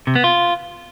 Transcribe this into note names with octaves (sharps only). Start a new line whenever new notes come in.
C3
B3
F4